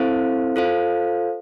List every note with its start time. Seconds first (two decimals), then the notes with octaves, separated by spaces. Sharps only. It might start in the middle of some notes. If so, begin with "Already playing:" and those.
Already playing: C4 E4 A4 C5 F5
0.56 F4 A4 C5 F5